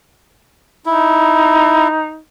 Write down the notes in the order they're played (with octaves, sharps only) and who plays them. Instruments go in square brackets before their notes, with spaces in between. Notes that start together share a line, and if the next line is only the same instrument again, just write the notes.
[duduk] D#4 [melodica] E4